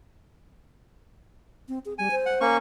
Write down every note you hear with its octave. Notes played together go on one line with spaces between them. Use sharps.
C4
G#4
G3 G#5
C5
F#5
A#3 C#4 C#6